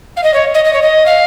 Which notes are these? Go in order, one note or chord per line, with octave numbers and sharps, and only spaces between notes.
F5
D#5
C#5
D#5
D#5
C#5
D#5
F5